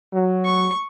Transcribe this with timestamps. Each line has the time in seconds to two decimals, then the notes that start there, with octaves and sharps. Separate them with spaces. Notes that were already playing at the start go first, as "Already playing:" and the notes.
0.13 F#3
0.45 C#6